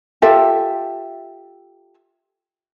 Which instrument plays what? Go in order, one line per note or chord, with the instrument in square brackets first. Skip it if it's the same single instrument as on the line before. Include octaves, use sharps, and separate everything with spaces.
[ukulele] F4 G4 A4 E5